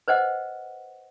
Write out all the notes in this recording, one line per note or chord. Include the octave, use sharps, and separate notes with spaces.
B4 C5 D#5 F#5